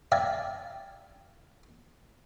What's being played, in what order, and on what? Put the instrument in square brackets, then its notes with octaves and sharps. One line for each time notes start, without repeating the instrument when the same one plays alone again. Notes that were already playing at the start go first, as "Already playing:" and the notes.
[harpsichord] D5 E5 F5 G5 G#5 A#5